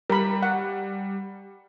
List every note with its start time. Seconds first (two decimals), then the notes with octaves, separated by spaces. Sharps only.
0.10 G3 A#4 B5
0.43 F#5